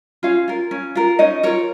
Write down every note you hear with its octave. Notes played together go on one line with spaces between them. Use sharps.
C#4 F4 F5
F4 A#4
C#4
F4 A#4
C#4 D#4 D#5
F4 A#4 C#5